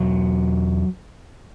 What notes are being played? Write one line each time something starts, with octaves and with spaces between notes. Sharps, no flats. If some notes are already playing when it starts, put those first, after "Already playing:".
Already playing: E1 E2 B2 F#3